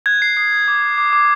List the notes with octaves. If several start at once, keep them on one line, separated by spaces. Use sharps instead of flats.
F#6 G#6
F#6 C7
D#6 C7
D#6
D6
D6
D6
D6